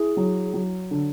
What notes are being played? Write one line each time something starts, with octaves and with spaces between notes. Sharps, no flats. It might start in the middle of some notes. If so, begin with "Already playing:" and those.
Already playing: E4 G#4
F#3
F#3
D3